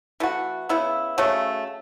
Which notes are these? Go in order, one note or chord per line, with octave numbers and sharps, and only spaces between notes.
E3 A3 F#4
C#3 E3 B3 E4
C#3 F#3 A3 C#4